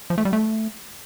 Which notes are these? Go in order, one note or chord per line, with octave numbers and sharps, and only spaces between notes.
F3
A3
G3
A3